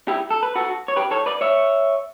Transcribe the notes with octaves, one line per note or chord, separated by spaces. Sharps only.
E4 G4
A4
B4
F#4 A4
C#5
G4 B4
A4 C#5
B4 D5
C#5 E5